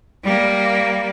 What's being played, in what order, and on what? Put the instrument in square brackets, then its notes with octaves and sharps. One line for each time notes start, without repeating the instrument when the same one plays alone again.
[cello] G3 A#3